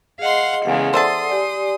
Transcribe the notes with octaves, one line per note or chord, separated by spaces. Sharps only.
G#4 D#5 F5 F#5 C6
E2 C#3 G#3 A4 F5 F#5
A4 C5 D5 E5 F#5 A5 C6 D#6
G4 D5 G#5